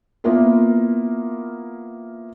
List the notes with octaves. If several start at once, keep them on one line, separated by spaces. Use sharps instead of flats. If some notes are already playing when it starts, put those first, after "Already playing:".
A#3 B3 E4 F4 A#4